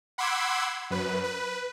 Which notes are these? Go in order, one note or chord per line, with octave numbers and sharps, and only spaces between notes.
F#5 B5 C6 D6 E6 G#6
F#2 B4
B4